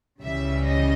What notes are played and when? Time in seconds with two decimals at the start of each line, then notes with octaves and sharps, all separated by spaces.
0.23 C#2 C#3 E3 G3 E5
0.65 D#5